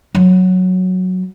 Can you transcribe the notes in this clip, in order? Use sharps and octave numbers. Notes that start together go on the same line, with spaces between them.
F#3